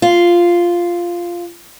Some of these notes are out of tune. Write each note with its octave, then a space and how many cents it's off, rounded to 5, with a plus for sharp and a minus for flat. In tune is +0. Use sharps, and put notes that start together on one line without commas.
F4 -5